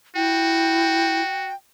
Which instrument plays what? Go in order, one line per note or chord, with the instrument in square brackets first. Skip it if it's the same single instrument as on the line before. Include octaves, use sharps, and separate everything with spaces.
[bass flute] E4 [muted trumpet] F#4 [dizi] G5